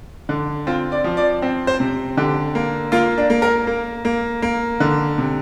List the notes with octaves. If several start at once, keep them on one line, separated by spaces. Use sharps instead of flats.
D3
C4 F4
D5
F3
D5
C4
C5
C3
D3 G4
A#3
A#3 F4
D4
A#3
A#4
A#3
A#3
A#3
D3
C3